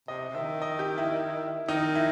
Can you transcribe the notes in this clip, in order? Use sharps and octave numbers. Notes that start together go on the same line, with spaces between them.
C3 D#5
C3
D#3 E5
D#5
G4
E4
D#3 D#4
E4